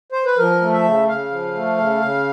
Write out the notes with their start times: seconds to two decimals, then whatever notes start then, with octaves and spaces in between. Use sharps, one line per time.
0.12 C5
0.25 B4
0.38 F3 A#4
0.61 A3
0.73 E5
0.84 C#3
1.08 C#3 F5
1.31 F3
1.54 A3
1.77 C#3
2.01 C#3